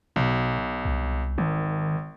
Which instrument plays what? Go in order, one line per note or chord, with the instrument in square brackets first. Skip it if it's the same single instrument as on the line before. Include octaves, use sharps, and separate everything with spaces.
[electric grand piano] B1 [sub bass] B2
[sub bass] C2
[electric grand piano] G#1 [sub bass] D#3